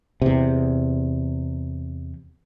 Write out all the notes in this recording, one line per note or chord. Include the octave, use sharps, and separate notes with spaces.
E2 C3